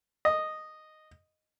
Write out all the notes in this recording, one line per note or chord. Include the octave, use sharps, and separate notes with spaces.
D#5